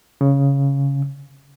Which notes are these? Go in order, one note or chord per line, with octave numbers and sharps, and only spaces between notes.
C#3